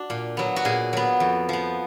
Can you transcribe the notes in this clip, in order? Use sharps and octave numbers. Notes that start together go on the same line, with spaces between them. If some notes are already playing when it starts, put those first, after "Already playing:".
Already playing: D4 F#4
A#2
F#3 B3
F#4
A#2 G#4
F#3 B3
F2
F3 B3